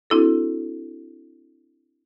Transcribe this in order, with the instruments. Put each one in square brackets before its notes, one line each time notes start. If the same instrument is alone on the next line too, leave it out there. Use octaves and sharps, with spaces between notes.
[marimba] C4 D4 E4 F#4 A4